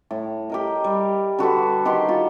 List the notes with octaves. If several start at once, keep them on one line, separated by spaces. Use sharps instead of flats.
A2
G4 A#4 D#5
G3
D3 F#4 A4 B4
D#3 G4 F#5 C6
F4 F#4